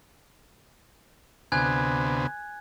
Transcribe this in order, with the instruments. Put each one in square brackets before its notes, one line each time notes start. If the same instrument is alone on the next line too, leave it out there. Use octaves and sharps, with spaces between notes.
[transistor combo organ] D2 C3 B3 [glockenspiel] G#5 F#6 G#6